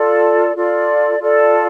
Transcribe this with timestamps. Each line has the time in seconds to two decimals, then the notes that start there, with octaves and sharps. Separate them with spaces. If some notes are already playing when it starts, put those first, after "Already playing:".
Already playing: F4 A4 D5
0.55 F4 A4 D5
1.19 F4 A4 D5